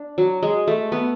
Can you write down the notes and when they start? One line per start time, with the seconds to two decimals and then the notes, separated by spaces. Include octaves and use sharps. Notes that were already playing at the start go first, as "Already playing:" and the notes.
Already playing: D4
0.18 F#3
0.43 G#3
0.67 A3
0.92 B3